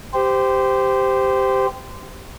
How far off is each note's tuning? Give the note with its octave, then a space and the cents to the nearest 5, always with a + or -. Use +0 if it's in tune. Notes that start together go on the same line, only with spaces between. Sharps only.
G4 +0 C5 -20